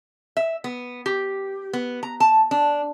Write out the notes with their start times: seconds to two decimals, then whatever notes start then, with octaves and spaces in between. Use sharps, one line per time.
0.37 E5
0.64 B3
1.06 G4
1.73 B3
2.03 A#5
2.20 A5
2.51 D4